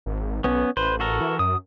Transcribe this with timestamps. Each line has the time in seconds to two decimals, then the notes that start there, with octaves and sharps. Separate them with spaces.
0.06 G#1
0.44 B1 B3 C#4
0.77 A1 B4 C5
1.00 F#4 A4 A#4
1.21 E3
1.39 F#2 D#6